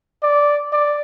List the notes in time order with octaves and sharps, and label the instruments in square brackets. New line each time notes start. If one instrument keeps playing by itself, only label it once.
[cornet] D5
D5